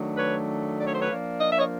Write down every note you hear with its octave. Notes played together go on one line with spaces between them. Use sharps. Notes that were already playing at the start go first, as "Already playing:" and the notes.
Already playing: D#3 F#3 A3 D4
B4 C#5
D5
C#5
C5
B4 C#5
F3 A#3 D4
D#5
E5
C#5 D#5